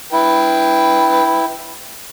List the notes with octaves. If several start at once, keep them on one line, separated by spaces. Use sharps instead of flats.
E4 B4 G5